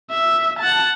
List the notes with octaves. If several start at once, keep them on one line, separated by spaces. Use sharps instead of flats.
E5
F#5 A5